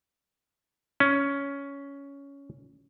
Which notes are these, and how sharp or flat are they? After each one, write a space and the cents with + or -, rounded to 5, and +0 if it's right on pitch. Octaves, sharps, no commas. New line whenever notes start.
C#4 +10